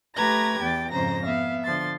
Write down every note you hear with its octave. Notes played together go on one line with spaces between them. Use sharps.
A3 G4 B4 A#5 G#6 A#6
E2 G5 A6
F2 G#2 C#3 C5 A#5 A#6
B3 E5 F5
D3 F3 C6 A6